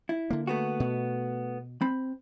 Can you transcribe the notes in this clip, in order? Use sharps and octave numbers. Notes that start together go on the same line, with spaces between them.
E4
D3 A#3
A3 B3 F#4
B2
C4 B5